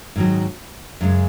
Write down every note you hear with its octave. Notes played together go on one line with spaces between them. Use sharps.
G#2 D#3 F#3
F#2 C#3 G#3